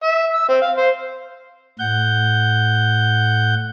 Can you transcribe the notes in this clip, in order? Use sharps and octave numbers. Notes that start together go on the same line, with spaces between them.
E5
E6
C4
F5
C5
A2 F#5 G6